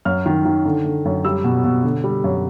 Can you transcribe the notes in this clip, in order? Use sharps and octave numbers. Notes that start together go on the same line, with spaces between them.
F#2 F6
D#3
D#3
D3
D3
F#2
G3 E6
B2
B2
D3
G3
F#2